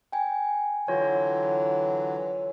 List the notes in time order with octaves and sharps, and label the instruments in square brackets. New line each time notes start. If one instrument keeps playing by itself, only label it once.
[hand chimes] G5 G#5
[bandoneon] D3 E3 F#3 [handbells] F4 C#5